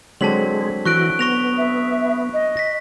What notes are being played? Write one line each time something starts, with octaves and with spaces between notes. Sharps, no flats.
D3 F#3 G#3 C4 A5 B6 F#7
E3 F#4 C#6 F#6 D7
B3 C#6 A#6 F7
E5
D#5
A#6 B6